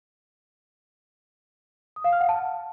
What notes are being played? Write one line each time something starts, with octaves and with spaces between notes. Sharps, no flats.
D#6
F5
F6
F#5
A5